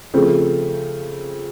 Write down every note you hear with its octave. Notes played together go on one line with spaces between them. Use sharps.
C#3 F3 A3 C4